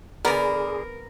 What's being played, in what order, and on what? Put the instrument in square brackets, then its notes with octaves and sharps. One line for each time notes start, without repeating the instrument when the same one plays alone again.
[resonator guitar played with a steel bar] D3 D5 [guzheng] B3 [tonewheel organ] G#4 [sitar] A#4